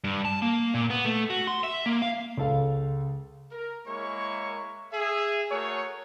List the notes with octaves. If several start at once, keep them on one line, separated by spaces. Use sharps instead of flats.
G2
A5
A#3
A#2
B3
A3
F#4
C6
E5
A#3
F5
C#2 A4 F5
A#4
G#3 A#3 E4 A#4 C#5 C#6
G#4 E5
A3 F#4 G#4 A#4 C#5